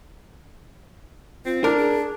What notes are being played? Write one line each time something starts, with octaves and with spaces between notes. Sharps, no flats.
C4 F4
D4 E4 A#4
G#4